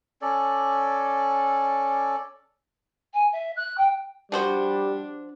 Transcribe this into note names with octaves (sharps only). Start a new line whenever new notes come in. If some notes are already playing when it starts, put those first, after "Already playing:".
C#4 A4 D5
G#5
E5
F#6
G5
F3 G3 D4 F#4 C5